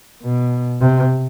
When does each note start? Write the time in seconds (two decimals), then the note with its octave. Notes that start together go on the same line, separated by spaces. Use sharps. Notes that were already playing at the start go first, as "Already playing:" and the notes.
0.23 B2
0.80 C3